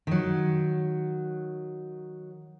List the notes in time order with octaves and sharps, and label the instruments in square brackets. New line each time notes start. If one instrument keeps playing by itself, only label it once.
[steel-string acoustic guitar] D#3 F#3